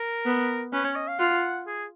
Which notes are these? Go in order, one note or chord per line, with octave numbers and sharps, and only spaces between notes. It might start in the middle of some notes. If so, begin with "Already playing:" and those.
Already playing: A#4
B3
C#4 B4
C#5
D#5
F5
F4 F#5
G#4